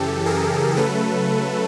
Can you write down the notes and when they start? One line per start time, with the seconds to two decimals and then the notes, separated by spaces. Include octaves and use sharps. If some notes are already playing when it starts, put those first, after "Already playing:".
Already playing: F#2 C#3 E3 G4 A4
0.26 G#4 A#4
0.77 C#3 F#3 A3 A4 B4